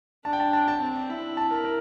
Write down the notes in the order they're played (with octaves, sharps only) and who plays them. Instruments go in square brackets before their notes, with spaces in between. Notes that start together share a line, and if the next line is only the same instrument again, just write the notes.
[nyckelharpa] D4 [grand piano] A5
[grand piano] G5
A5
A5
A5
[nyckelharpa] C4
E4
[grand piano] A5
A#4
A#4